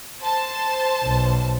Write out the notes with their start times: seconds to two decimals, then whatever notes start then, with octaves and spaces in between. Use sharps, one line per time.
0.20 C5 A5
1.04 B1